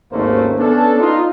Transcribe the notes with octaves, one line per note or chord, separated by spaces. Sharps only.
G#1 D#2 A3 A#3 C#4 C5
B3 C#4 D4 A4
D#4 F4